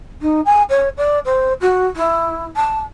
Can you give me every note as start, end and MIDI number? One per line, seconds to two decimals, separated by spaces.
0.21 0.41 63
0.45 0.63 80
0.69 0.89 73
0.97 1.19 74
1.25 1.53 72
1.61 1.85 66
1.96 2.46 64
2.57 2.79 81